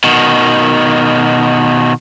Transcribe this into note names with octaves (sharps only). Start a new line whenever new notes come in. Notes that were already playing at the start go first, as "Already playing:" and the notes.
B2 D#3